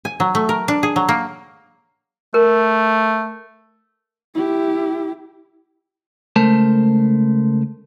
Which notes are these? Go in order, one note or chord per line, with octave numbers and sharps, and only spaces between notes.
G#5
F#3
A3
A#4
D4
G#4
F#3
A#3
A3 A#4
E4 G4
C#2 A3 A#4 C5 A5